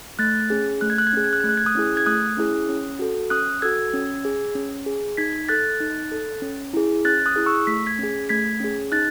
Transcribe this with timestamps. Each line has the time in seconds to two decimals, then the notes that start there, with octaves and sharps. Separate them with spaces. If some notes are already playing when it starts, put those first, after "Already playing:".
0.19 A3 F#6 A6
0.50 C#4 G#4
0.81 A3 F#6
0.90 G#6
0.98 F#6
1.07 G#6
1.13 C#4 G#4 F#6
1.24 G#6
1.33 F#6
1.41 A3 G#6
1.49 F#6
1.57 G#6
1.66 D#6 F#6
1.75 C#4 E4 G#4
1.97 G#6
2.06 A3 D#6 F#6
2.37 C#4 E4 G#4
2.69 C#4
2.99 F#4 A4
3.30 C#4 D#6 F#6
3.62 F#4 A4 E6 G#6
3.94 C#4
4.25 G#4
4.55 C#4
4.86 G#4
5.17 D#4 G#6 B6
5.49 A4 F#6 A6
5.80 D#4
6.12 A4
6.42 C#4
6.74 E4 G#4
7.05 C#4 F#6 A6
7.26 D#6 F#6
7.36 E4 G#4
7.46 C#6 E6
7.67 A3 B6
7.86 G#6 B6
7.99 C#4 G#4
8.29 A3 G#6 B6
8.60 C#4 G#4
8.92 D#4 F#6 A6